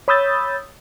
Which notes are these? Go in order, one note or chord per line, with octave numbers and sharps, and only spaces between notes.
C#5 B5 D#6 E6 G6 A6